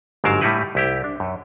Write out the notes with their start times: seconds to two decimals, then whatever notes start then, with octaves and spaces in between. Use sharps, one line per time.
0.24 G1 G#2 F#3 A#4 F5 A5
0.41 A2 G3 D#4 E4 B4
0.75 C2 E4 G4
1.04 D4
1.20 F#2